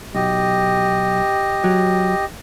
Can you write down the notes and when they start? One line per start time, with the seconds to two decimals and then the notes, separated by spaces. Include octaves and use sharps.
0.15 B1 G4 D#5
1.64 F#3